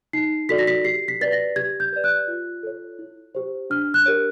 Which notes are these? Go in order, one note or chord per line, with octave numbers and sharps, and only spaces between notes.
D#4 C7
F#4 A4 D5 B6
A#6
B6
G4 C7
B6
B4 D5 A6
A#6
G4 G#6
G6
B4 D5
F#6
F4
A4 C#5
E4
G4 C5
D4 F6
F#6
G4 A#4 C#5